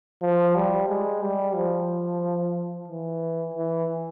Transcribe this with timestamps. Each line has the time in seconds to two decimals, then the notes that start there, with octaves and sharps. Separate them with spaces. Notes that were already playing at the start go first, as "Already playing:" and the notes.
0.22 F3
0.55 G3
0.89 G#3
1.22 G3
1.55 F3
2.88 E3
3.54 E3